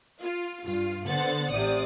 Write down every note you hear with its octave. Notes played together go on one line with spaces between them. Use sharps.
F4
G2 F4
D3 B3 C5 F#5 A6
A1 C3 D5 D#6